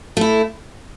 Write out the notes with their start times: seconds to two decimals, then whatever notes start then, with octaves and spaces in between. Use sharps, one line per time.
0.17 A3 E4